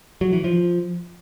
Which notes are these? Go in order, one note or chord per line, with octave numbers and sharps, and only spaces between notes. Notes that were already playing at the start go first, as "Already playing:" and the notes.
F#3
E3
F3